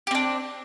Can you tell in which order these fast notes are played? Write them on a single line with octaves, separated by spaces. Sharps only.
G4 C4 D4